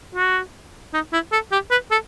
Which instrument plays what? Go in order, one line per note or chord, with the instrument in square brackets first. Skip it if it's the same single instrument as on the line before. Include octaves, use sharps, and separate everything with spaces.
[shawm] F#4
D#4
E4
A4
G4
B4
A4